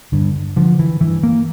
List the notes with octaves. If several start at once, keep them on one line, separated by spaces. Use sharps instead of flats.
G2 D3
D3 F3
E3
G2 E3
A#3